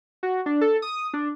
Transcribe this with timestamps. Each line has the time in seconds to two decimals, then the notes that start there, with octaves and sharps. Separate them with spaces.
0.23 F#4
0.46 D4
0.61 A4
0.82 D#6
1.14 D4